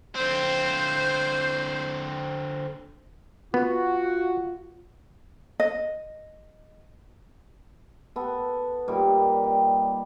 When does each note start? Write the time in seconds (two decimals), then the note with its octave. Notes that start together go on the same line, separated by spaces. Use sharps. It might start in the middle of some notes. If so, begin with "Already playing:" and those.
0.15 D3 C4 C5
3.54 B3 F4 F#4
5.60 D#5
8.16 B3 A4
8.88 A#2 G3 D#4
9.44 G5